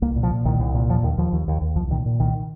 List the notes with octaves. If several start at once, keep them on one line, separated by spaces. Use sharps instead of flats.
C2 A#3
A#2
F3
A#2
C2 D#3
C2
A#2
D#2 F3
D#2 D#3
D#2 F3
D#2
D#2
D#2
C2 F3
A#2 D#3
A#2
C2 D#3